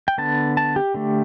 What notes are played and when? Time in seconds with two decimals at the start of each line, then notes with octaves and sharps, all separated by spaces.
0.08 G5
0.18 D3 B3 A5
0.57 A5
0.76 G4
0.94 D3 A3